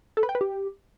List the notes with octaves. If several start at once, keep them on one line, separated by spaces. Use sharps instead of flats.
A4
B4
G5
B4
G4